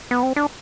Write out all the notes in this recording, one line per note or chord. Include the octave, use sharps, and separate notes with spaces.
B3
C4
D4